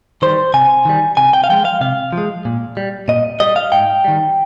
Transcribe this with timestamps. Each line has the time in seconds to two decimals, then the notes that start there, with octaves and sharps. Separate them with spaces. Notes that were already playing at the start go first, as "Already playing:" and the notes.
0.22 D#3 G3 C5
0.54 C3 G#5
0.85 D#3 G3
1.17 C3 G#5
1.33 G5
1.44 F5
1.50 F3 G#3 G5
1.65 F5
1.81 C3 F5
2.13 F3
2.18 G#3
2.45 A#2
2.77 G3
3.08 A#2 D#5
3.40 G3 D#5
3.56 F5
3.72 G#2 G5
4.04 D#3 G3